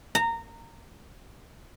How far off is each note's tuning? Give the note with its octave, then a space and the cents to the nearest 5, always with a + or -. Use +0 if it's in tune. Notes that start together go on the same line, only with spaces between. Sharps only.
A#5 -20